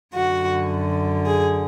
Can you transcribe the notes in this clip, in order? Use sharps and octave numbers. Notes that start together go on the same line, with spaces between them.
F#2 D3 F#4
G#4